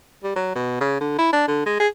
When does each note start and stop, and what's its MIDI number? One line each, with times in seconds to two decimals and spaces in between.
0.23 0.33 55
0.36 0.55 54
0.55 0.78 47
0.81 0.97 49
1.00 1.16 50
1.18 1.32 64
1.33 1.47 62
1.48 1.65 50
1.66 1.80 56
1.80 1.88 68